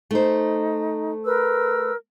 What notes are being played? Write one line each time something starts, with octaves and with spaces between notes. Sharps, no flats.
A3 D#4 C5
A#4 B4 E6